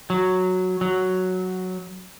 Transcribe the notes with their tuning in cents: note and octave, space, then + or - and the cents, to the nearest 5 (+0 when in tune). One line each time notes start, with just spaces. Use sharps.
F#3 -5
F#3 +0